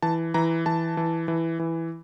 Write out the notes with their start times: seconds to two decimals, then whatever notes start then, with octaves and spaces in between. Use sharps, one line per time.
0.02 E3 A5
0.34 E3 A#5
0.66 E3 A5
0.97 E3
1.28 E3
1.59 E3